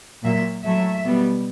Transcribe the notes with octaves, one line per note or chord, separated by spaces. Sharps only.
A#2 F#3 A#3 E5
A2 F#3 A3 E5
B2 G3 B3